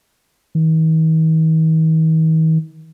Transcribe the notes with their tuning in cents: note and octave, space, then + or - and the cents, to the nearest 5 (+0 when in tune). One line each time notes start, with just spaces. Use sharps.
D#3 +45